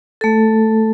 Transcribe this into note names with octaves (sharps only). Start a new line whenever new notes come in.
A3 A4